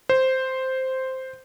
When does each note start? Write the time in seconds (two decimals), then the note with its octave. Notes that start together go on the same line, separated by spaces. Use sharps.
0.09 C5